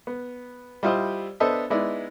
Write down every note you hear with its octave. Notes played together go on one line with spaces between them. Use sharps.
B3
G3 E4 F4 C5 D#5
B3 D4 A4 C5 D#5 E5
G#3 B3 D#4 E4 D5